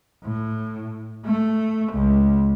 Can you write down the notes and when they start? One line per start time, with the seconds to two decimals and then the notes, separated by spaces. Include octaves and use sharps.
0.24 A2
1.25 A3
1.92 C#2